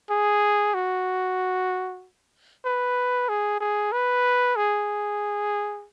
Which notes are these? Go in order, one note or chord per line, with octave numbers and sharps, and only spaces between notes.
G#4
F#4
B4
G#4
G#4
B4
G#4